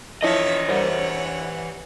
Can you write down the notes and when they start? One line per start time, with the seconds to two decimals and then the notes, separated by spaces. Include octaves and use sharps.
0.23 E3 F3 E4 C#5 D#5 E5
0.69 G3 A#4 C5 C#5 F#5